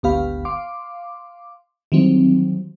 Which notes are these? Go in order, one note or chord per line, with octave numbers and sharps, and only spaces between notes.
G#1 D2 B3 G4 F5 B5
F5 C6 D6
D#3 E3 F#3 G3 C4 D#4